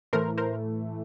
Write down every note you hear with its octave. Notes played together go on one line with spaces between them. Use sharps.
A2 E3 A3 A#4 C5
A#4 C5